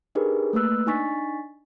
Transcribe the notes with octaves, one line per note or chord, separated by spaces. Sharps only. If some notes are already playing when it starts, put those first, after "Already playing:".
D4 D#4 G4 G#4 A#4 B4
A3 A#3 B4 E6 F#6
D4 D#4 G#5 C#6 A6 B6